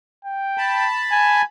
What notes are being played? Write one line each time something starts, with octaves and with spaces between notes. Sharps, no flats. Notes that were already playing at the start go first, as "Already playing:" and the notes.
G5
A5 B5
G#5